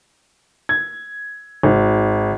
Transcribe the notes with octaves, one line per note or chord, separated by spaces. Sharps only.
G#6
G#1